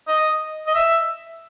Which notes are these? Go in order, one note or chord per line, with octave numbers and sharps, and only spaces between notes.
D#5
D#5
E5